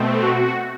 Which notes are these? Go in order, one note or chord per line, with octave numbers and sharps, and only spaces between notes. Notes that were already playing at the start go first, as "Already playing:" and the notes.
Already playing: B2 A3 C4
F#4